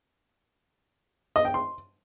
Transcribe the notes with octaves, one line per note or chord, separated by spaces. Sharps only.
D#5
G5
C6